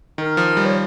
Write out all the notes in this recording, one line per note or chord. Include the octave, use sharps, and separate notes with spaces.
D#3 A#4
F3
G3
C#5